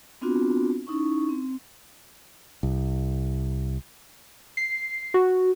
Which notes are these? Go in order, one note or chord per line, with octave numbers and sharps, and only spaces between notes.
B3 C4 D4 F4 F#4
C#4 D#4 E4 C#6
C4
C2
C7
F#4